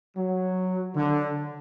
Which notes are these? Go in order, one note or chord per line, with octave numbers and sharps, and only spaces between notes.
F#3
D3